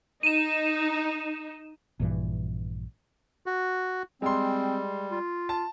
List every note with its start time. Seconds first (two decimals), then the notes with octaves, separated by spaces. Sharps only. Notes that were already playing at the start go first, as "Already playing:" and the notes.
0.23 D#4 D#7 E7
2.00 A#1 G2 E3
3.46 F#4
4.22 G3 G#3 C4 C6
5.11 F4
5.49 A5